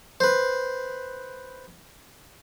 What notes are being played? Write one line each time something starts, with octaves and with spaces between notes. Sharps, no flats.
B4 C5